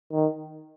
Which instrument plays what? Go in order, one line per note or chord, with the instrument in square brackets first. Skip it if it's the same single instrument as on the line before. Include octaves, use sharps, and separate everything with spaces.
[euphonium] D#3